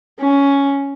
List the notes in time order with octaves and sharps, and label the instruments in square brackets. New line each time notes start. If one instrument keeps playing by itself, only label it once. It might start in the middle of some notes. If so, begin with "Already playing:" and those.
[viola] C#4